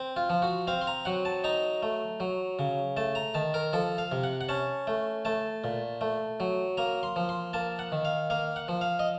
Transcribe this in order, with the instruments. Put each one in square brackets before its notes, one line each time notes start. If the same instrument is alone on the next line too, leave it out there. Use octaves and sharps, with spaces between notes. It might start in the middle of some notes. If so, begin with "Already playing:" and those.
Already playing: [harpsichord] C4
F4
F3
F#4
C4 F5
C6
A#5
F#3 F#5
A5
D#4 A#5
A3
F#3
C#3
A3 A5
A#5
D#3 A5
A#4
F3 A4
F5
C3
F#5
F#5
C#4 A5
A3
A3 A5
A#2
A3
F#3
A#3 A#5
C6
F3
C6
A#3 A5
F#5
D#3
F5
A#3 F5
F#5
F3
F5
D#5